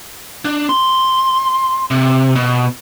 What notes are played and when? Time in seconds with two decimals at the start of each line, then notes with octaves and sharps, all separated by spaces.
0.45 D4
0.69 C6
1.91 C3
2.36 B2